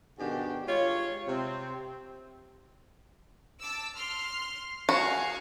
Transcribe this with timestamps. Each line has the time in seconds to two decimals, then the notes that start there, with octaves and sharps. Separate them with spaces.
0.19 G#2 B2 D#3 D4 F#4 G4
0.67 G3 G#3 F4 C#5
1.27 C3 C4
3.60 A5 D6 E6
3.96 C6 F6
4.89 F#4 G#4 F5 G#5